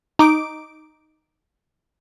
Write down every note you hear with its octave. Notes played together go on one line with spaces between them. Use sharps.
D#4 D6 D7